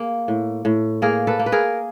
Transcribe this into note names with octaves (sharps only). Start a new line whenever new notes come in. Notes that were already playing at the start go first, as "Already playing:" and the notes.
Already playing: A#3 G#4
A2
A2
A#3 G#4 A#4
A4 B4
A#3
B4
G#4 A#4